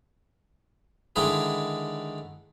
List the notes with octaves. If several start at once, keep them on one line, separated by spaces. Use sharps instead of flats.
D3 D#3 G#3 E4 G#4 B4